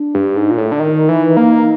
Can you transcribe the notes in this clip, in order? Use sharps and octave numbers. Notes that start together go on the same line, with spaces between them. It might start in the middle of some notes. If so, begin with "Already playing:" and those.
Already playing: D4
G2
G#2
A#2
A2
D3
D#3 D#4
E3
A#3